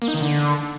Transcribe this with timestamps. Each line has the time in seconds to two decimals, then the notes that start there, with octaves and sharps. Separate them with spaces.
0.02 A#3
0.08 D#4
0.14 D#3
0.21 D3